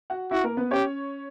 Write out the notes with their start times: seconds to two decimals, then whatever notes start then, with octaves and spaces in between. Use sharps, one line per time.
0.10 F#4 F#5
0.31 E4 F#4 E5
0.43 A#3 A#4
0.57 B3 B4
0.71 C#4 G4 C#5